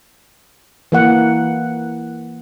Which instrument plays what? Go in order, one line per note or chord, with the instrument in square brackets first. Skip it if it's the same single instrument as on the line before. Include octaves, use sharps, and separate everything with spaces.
[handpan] E3 A#3 F#5